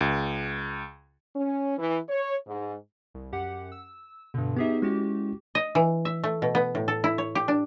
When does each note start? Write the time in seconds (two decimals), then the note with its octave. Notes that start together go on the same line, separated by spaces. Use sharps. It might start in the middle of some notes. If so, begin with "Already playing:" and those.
0.01 C#2
1.35 C#4
1.78 E3
2.09 C#5
2.47 G#2
3.14 C2
3.32 F#2 G4 F#5
3.72 E6
4.34 G2 B2 D3
4.57 B3 D#4 G4 G#4 E5
4.82 G#3 C#4 E4 F#4 G4
5.55 D#5
5.75 E3
6.05 E5
6.24 A3
6.42 B2
6.55 B3
6.75 A2
6.88 A4
7.04 E4
7.18 C#5
7.35 G4
7.48 D4